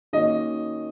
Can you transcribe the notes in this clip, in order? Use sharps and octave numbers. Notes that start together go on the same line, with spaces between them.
D#3 A#3 C#4 F#4 A#4 D#5